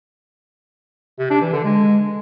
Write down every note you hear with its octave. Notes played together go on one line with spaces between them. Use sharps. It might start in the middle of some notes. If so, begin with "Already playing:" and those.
C3
D4
E3
D3
G#3